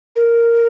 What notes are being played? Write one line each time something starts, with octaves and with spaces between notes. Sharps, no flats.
A#4